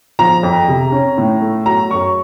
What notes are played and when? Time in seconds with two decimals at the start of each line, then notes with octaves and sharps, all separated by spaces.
0.19 F3 A#5
0.43 F2
0.68 C3
0.92 C#4
1.18 A2
1.42 A3
1.66 F#3 A#5
1.91 F#2 C#6